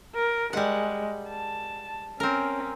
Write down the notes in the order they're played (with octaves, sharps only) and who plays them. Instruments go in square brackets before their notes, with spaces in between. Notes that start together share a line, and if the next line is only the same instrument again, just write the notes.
[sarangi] A#4
[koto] G3 F#5 [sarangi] G#3
[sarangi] A5
[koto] C4 A#4 [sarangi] C#4